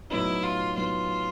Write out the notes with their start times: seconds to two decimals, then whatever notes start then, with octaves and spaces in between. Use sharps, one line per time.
0.10 A2 F#3 B3 D#4 E4
0.43 F4
0.76 A2 F#3 B3 D#4 F4